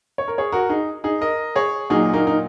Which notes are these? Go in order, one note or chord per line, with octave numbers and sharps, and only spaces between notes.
C#5
A#4
G#4 C#5
F#4 A#4
D#4 G#4
D#4 G#4
A#4 D#5
G#4 C#5
A#2 F#3 D#4 G#4
A#3 D#4
D#4